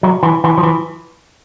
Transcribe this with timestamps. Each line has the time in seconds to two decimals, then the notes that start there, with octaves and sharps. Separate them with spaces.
0.03 F#3
0.23 E3
0.44 E3
0.58 F3
0.63 E3